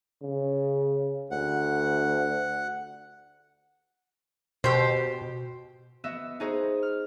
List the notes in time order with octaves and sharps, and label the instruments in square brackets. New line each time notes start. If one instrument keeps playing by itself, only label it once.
[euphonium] C#3
[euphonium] D2 [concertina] F#5
[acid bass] B2 [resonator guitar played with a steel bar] G4 C5
[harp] B3 F#4 D#5 E5
D#4 F#4 G#4 C5 D#5
F6